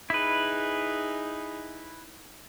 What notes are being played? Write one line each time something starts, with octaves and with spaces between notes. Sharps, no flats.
D#4 E4 G#4 B4